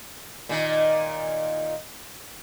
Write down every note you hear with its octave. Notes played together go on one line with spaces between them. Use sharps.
A#2 D#3